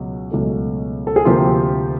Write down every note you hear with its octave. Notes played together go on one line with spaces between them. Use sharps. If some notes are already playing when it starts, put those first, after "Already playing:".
Already playing: C#2 B2 F#3
C#2 B2 F#3 A3
A4
G#4
D2 C3 F3 A#3 F4 G4